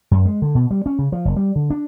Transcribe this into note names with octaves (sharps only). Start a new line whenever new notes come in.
F#2
G#3
D3
B2
G3
C#4
C#3
F3
F#1
G3
D3
D4